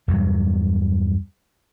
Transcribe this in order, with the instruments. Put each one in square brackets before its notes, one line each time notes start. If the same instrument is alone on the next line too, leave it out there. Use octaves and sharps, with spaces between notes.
[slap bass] E2 G2 C3 F#3